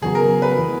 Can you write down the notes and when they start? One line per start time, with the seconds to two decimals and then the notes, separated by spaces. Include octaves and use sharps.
0.01 C#3 F#3 B3 F#4 G#4
0.15 A#4
0.42 B4
0.57 E3 G#3 B3